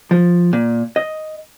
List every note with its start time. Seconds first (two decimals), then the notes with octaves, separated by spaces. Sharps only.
0.11 F3
0.53 A#2
0.96 D#5